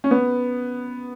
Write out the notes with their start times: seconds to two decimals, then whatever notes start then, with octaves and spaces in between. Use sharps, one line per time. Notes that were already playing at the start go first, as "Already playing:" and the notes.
0.04 C#4
0.11 B3